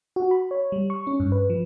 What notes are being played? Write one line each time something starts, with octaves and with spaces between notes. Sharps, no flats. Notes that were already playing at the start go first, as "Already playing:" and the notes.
F#4
B5
C#5
G3
C#6
C#4
G2
B4
F3